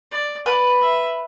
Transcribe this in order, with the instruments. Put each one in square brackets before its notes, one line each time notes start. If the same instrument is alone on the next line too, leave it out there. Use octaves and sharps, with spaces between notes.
[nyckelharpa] D5
[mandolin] B4 [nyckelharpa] D5
[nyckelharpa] E5